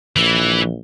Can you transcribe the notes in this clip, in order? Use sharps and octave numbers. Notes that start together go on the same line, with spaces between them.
A#1 E3